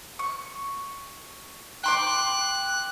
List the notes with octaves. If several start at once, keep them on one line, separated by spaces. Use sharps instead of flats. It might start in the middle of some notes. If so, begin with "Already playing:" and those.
C#6
G5 C6 D6 F#6